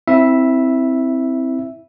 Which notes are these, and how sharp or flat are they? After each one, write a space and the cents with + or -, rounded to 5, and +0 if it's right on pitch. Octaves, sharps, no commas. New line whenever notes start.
C4 +0 E4 -20 E5 +0